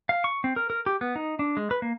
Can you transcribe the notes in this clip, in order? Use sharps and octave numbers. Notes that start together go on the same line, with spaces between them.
F5
C#6
C4
A#4
A#4
G4
B3
D#4
D4
G#3
B4
A#3